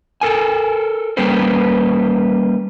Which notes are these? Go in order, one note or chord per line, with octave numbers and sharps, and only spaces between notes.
A4 A#4 G#5
G3 A#3 C#4 B4 C5